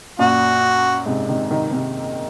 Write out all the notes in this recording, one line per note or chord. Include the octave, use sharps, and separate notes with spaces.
F#2 A#2 F#4
G#2 C3
C3 D#3
C3 D#3
C3 D#3